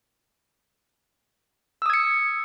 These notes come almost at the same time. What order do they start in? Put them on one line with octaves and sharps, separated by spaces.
E6 D#6 G#6 C#7